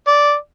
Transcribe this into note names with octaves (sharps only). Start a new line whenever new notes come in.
D5